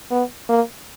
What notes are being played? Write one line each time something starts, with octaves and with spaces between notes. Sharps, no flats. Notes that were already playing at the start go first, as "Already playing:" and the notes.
B3
A#3